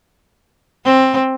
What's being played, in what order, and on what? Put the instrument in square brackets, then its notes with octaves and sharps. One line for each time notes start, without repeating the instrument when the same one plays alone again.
[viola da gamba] C4